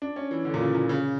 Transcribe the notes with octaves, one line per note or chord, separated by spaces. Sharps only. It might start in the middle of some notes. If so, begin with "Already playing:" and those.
D4
C#4
E3
D3
A#2
C#3
A#2
C#3